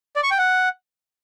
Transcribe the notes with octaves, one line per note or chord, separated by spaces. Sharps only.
D5
C#6
G5
F#5